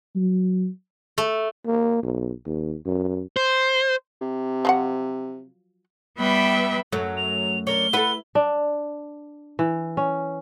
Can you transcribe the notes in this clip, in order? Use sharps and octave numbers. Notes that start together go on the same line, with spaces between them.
F#3
A3
A#3
B1
D#2
F#2
C5
C3
F3 F#3 F#5
G3 B3 B4 E5 G5 B5
F#2 F#3 A3
F7
D4 A#4 C#5 G7
E4 A4 B4 F#5
D4
E3
C#4